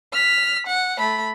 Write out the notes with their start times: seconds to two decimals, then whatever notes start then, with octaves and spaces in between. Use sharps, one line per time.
0.12 F6 B6
0.67 F#5
0.98 A3 B5